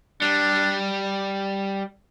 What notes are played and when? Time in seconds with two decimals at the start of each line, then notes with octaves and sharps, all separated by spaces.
0.21 G3 D4